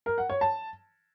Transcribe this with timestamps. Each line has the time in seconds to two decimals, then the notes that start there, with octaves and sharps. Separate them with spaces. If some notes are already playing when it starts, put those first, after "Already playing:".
0.06 A#4
0.18 F#5
0.30 C#5
0.41 A5